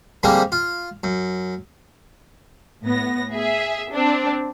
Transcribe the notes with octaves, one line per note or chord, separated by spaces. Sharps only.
D3 F3 G3 G#3 A#3 C4
F4
F#2
A2 B3 A#6
G#4 E5
C4 D4